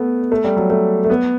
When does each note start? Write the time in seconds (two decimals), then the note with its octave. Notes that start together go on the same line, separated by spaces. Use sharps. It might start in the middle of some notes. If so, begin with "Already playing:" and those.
Already playing: A3 B3
0.32 A3
0.44 G3
0.57 F#3
0.70 A3
1.04 A3
1.10 B3